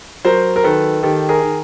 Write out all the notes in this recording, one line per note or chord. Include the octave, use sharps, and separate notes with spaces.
F#3 A#4 C5
A#4
D#3 A4 B4
D#3 G4 A4
G#4 A#4
D#3